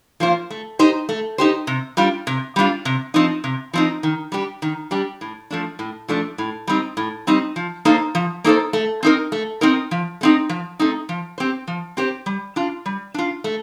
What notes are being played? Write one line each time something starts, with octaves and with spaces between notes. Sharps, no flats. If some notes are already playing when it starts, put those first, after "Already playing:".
F3 A#3 F4 C5
A3
D#4 G4 C5
A3
D#4 G4 C5
C3
G3 D4 F4
C3
G3 D4 F4
C3
F3 C4 D#4
C3
F3 C4 D#4
D#3
G3 D4 G4
D#3
G3 D4 G4
A2
F3 A3 D4
A2
F3 A3 D4
A2
G3 C4 D#4
A2
G3 C4 D#4
F3
A#3 D#4 A4 C5
F3
A#3 D#4 A4 C5
A3
C4 D#4 A#4
A3
C4 D#4 A#4
F3
A3 C4 D#4
F3
A3 C4 D#4
F3
C4 G4 C5
F3
C4 G4 C5
G3
D4 F4
G3
D4 F4
A3